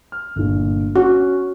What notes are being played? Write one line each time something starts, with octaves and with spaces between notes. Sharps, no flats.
F6
G1 A#2
C#4 F#4